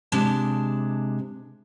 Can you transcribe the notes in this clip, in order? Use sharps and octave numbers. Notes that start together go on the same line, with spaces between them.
C3 G#3 D4 A5